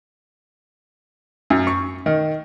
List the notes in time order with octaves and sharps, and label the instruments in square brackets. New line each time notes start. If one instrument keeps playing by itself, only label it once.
[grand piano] F#2
C#6
D#3